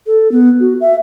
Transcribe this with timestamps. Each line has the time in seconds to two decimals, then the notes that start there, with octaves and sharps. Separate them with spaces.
0.06 A4
0.32 B3
0.60 F#4
0.81 E5